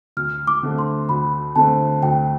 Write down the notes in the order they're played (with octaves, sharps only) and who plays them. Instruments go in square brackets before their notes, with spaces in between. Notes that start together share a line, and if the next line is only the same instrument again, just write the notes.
[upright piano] D2 [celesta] F6
[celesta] D6
[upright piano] D3 A3 C4
[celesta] C6
[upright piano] D2 [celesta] B5
[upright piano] D3 A3 C4 [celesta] A5
[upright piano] D2 [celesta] G5